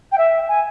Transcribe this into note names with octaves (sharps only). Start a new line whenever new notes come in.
G5
E5
G#5